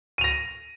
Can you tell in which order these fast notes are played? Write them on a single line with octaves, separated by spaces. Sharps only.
D#7 F7 A#6